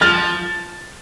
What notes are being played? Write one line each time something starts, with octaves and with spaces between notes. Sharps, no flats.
F3 F6 A6